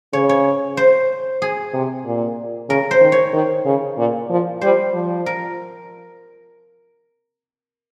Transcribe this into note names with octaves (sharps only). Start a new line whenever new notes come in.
C#3 C#5
C#5
C5
G#4
C3
A#2
C#3 A#4
C5
D#3
C#5
D#3
C#3
A#2
F3
G3 C5
F3
A#4